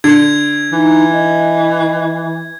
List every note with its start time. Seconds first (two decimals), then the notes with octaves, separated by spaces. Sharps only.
0.04 D3 G#6
0.73 E3 D#4
1.13 D#5